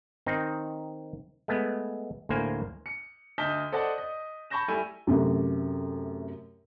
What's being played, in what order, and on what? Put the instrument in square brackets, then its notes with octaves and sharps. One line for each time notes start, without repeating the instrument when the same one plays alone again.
[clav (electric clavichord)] D#3 C4 D#4
G#3 A3 B3
D2 A2 A#3 C5 G#5
[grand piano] C#7
D2 D#5 A5 G6 B6 G7
A4 C5 D5 D#5 F#5 A5
D#5
A5 B5 C#6 G6 A#6 E7
G3 A3 E4 G#5 E6 D#7
[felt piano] F#2 C3 A3